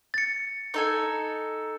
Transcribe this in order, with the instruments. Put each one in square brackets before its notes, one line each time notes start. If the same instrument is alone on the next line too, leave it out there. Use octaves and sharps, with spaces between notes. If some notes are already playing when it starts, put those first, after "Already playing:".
[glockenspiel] A6 C#7
[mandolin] D#4 A4 G#5